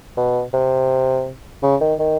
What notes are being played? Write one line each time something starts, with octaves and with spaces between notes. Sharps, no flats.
B2
C3
C#3
D#3
D#3